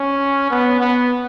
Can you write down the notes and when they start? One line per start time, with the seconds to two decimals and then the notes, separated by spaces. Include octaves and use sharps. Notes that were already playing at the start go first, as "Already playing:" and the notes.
Already playing: C#4
0.51 B3
0.80 B3